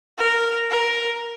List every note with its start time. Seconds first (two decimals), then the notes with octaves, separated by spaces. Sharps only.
0.18 A#4
0.71 A#4